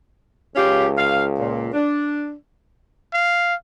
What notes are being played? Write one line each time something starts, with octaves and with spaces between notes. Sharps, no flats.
C#2 C#4 F4 G4
F5
A#2
D4
F5